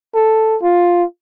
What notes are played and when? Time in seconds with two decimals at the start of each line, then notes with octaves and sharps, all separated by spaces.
0.15 A4
0.62 F4